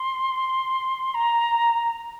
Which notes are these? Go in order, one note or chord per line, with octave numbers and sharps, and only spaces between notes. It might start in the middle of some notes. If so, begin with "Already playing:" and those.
Already playing: C6
A#5